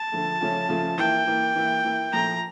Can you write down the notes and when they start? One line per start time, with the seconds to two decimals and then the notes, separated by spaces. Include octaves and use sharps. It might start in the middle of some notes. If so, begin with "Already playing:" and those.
Already playing: A5
0.12 D3 F3 A3
0.40 C#3 F3 A3 C#4 F4
0.69 C#3 F3 A3 C#4 F4
0.98 E3 A#3 E4 G5
1.27 E3 A#3 E4
1.56 E3 A#3 E4
1.84 E3 A#3 E4
2.12 A#2 F3 A3 A#5